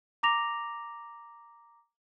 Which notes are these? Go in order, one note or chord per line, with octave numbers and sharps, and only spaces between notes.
A#5 D6 A#6 F7